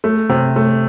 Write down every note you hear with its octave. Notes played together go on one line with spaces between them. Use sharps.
A3
C3
A3